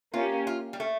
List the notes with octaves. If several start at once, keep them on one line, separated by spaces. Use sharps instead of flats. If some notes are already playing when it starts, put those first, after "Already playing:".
A#3 C#4 F4 G4
F4
G3
A3